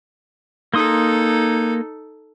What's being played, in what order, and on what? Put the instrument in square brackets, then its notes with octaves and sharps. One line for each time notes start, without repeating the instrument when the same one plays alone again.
[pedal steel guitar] A#3 C6 D#6 [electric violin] D#4 A4